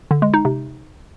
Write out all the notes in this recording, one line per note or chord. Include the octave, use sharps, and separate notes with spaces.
D3
G#3
D#4
C3